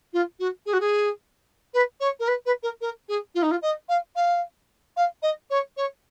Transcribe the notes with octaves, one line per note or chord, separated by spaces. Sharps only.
F4
F#4
G#4
F#4
G#4
B4
C#5
A#4
B4
B4
A#4
A#4
G#4
F4
D#4
F4
D#5
F5
F5
F5
D#5
C#5
C#5